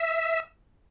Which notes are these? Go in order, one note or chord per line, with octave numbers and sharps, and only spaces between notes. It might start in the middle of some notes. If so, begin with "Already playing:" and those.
Already playing: E5